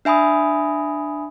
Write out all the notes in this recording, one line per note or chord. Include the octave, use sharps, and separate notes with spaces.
D4 E5 G#5 B5 D#6